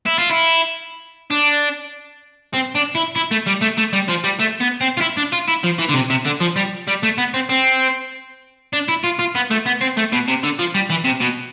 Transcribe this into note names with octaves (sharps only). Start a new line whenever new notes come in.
E4
F4
E4
D4
C4
D4
E4
E4
A3
G3
A3
A3
G3
F3
G3
A3
B3
C4
F4
E4
D4
F4
E4
F3
E3
D3
C3
C3
D3
F3
G3
G3
A3
B3
C4
C4
D4
E4
F4
F4
B3
A3
B3
C4
A3
B2
C3
D3
F3
G3
E3
C3
B2